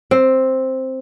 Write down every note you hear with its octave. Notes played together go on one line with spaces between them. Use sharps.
C4